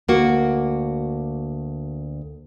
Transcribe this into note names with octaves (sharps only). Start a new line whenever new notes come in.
D2 A#3 F#4